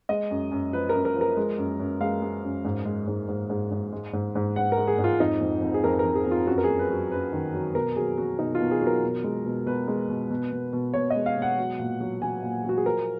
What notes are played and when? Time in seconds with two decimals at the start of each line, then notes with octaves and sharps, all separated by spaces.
0.09 G#3 D#5
0.31 F#2
0.52 F#2
0.73 F3 B4
0.89 A#4
0.94 F#2
1.05 A#4
1.16 F3
1.21 A#4
1.37 G#3
1.58 F#2
1.80 F#2
2.01 G#3 F5
2.22 G#3
2.44 F#2
2.65 G#2
2.85 G#3
3.07 G#2
3.28 G#2
3.50 G#2
3.71 G#2
3.93 G#3
4.13 G#2
4.35 G#2
4.56 G#2 F#5
4.72 A#4
4.77 G#3
4.87 G#4
4.98 G#2
5.04 F4
5.20 F2 D#4
5.41 F2
5.62 F2
5.74 G#4
5.83 F2 A#4
5.99 A#4
6.05 F2
6.15 G#4
6.26 F2
6.31 F4
6.47 F#2 F#4
6.58 A#4
6.64 F#3 G#4
6.79 B4
6.90 F#3
7.11 F#2 B4
7.33 D#3
7.54 F#3
7.75 B2 A#4
7.96 F#3 G#4
8.18 F#3 F#4
8.39 B2 D#4
8.55 F4
8.60 B2
8.71 G#4
8.82 F#3
8.87 A#4
9.03 B2
9.24 G#3
9.45 B2
9.66 B2 B4
9.88 G#3
10.09 B2
10.30 B2
10.52 B2
10.73 B2
10.94 B2 C#5
11.10 G#3 D#5
11.26 F5
11.37 B2 F#5
11.58 F#3
11.79 A#2
12.01 F#3
12.22 F#3 G#5
12.43 A#2
12.64 F#3 F#4
12.77 G#4
12.85 F3 A#4